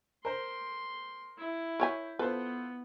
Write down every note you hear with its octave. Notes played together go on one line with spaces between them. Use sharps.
A#4 C5 C6
E4
A#4 C#5 G#5 C#6 G6 B6
B3 F4 A4 B4 C5